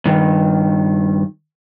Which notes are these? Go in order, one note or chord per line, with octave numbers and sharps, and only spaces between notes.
G2 D#3